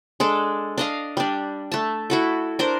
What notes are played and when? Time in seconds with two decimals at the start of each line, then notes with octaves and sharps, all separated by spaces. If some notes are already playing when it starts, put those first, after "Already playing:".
0.20 G#3 D4 A4
0.78 D4 D#5 F5
1.17 G3 D4
1.72 A3 A5
2.10 E4 F#4 A4
2.59 D4 A#4 C5